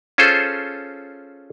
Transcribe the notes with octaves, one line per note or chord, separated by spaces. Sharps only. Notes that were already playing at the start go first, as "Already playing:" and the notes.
C#4 F4 G#4 A4 C5